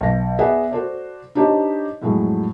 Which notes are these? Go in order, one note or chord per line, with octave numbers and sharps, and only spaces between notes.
B1 A#6
B3 G#4 D5 E5 F#5
F#4 A4 C5 D5
D4 D#4 G4 C5 C#5 D#5
F2 A2 F#3 G#3